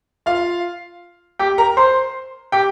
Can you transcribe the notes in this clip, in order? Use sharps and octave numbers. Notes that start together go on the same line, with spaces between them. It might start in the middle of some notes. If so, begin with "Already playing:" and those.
F4 F5
G4 G5
A#4 A#5
C5 C6
G4 G5